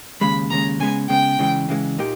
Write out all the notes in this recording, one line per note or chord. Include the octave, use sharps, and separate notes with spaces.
D#2 C#3 G#3 B5
D#2 C#3 G#3 A#5
C#3 G#3 B3 G#5
C#3 G#3 B3 G5
C#3 E3 G#3
C#3 E3 G#3
A#2 A#3 D#4 G4